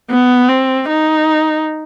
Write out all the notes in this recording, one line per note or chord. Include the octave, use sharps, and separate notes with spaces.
B3
C4
D#4